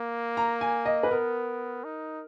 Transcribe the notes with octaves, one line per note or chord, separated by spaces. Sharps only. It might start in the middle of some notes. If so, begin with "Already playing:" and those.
Already playing: A#3
A#5
G#5
D#5
B4
B3 A#4
D#4